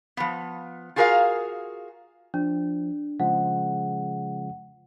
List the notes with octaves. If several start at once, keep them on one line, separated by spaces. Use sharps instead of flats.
F3 B3
F4 F#4 G#4 A#4 D5 F5
F3 D4
C#3 F3 G#3 F#5